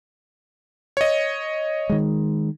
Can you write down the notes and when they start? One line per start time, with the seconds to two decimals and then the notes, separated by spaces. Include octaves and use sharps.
0.97 C#5 D#5
1.90 D#3 G#3